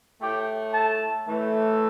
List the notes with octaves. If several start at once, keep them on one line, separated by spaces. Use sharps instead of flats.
A2 A3 G4 G5
A4 A5
A2 E3 A3